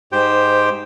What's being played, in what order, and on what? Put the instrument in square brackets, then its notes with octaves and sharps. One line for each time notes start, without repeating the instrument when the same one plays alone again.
[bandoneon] G#2 G4 C5 G5